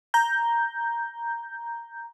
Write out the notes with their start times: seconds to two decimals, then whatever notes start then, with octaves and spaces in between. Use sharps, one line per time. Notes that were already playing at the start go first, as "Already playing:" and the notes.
0.14 A#5 G6